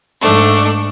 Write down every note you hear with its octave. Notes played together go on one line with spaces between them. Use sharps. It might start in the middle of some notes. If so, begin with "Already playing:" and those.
G#2 A3 D4